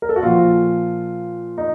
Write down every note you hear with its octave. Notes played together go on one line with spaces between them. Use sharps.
A#4
A4
F#4
A#2 F3 F4
D#4